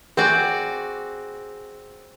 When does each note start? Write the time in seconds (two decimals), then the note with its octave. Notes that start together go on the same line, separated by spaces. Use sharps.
0.17 C4 F#4 G#4 D5